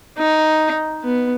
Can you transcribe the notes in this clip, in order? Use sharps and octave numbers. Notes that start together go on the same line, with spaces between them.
D#4
B3